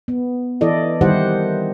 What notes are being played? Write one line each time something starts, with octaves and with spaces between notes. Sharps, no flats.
B3
E3 E4 A4 D5 D#5
D#3 G3 E4 G4 C5 F#5